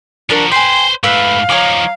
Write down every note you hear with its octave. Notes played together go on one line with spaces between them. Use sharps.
F3 D4 F#4 A#4
B4 C5 G5 G#5 C6
G#2 A3 B4 F5 E6
F3 D#4 C#5 A#5 D6